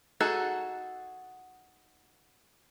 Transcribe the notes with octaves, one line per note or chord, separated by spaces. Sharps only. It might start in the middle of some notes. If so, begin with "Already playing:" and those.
D#4 F#4 G#4 A4 F#5